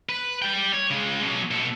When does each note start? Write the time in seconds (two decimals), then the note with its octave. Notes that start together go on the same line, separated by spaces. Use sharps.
0.09 B4
0.42 G3 G5
0.73 C#5
0.90 C#3 G#3
1.21 B2 F#3
1.51 B2 A4